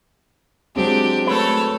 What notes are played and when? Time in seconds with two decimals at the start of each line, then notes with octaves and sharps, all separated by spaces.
0.76 F#3 G#3 C4 D4 G4
1.27 A3 A4 B4 C#5